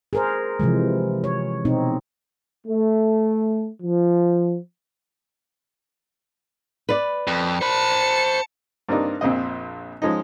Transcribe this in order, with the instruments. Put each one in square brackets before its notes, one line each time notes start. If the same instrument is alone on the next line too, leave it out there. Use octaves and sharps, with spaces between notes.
[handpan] G#4 A#4 C5
C3 E3 F3 G#3
C#5
B2 C4 D#4
[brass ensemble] A3
F3
[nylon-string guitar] B4 D5
[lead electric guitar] F2
[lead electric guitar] C5 B5 [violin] A5 C#7
[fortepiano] G2 A#3 C4 D4 D#4
A#1 F2 A#2 C4 C5 D#5
F3 G#3 C#4 D#4